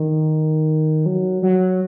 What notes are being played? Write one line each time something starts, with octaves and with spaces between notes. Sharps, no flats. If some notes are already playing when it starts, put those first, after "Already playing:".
Already playing: D#3
F#3
F#3